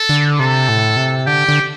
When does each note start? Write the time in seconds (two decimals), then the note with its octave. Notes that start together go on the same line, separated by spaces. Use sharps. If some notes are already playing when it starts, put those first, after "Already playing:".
Already playing: A4
0.09 D3
0.40 C3 A4
0.69 A2
0.97 C3
1.26 D3 G4
1.49 D3